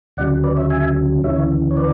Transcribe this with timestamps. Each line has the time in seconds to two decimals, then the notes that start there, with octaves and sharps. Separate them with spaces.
0.17 D2 C#3 F#3 D5 F#5
0.44 B4 D5
0.57 C#5 E5
0.70 E5 G#5
1.24 D2 C#3 E3 C#5 E5
1.71 C#5
1.77 B4 D5